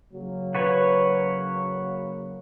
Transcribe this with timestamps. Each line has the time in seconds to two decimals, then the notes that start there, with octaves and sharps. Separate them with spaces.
0.13 C#3 F#3 A#3
0.55 F#4 B4 C#5